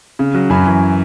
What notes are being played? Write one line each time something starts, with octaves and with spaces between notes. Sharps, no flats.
C#3
F#3
F#2 G#5 B5
E3